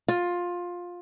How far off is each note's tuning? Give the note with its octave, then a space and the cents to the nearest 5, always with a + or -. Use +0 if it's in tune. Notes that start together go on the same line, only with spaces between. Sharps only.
F4 +15